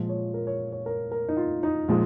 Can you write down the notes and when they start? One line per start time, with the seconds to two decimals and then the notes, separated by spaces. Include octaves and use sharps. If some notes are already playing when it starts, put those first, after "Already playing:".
Already playing: A#2 F3 G#3
0.09 C#5
0.34 A#4
0.47 C#5
0.72 C#5
0.86 A#4
1.12 A#4
1.29 D#4
1.37 F4
1.63 D#4
1.88 A#2 F3 G#3